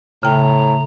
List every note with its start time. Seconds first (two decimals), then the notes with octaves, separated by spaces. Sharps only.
0.23 A2 C#3 G5 A#5